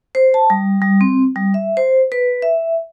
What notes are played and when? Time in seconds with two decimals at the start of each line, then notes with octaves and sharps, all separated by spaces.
0.15 C5
0.34 A5
0.50 G3
0.82 G3
1.01 C4
1.36 G3
1.54 E5
1.77 C5
2.12 B4
2.42 E5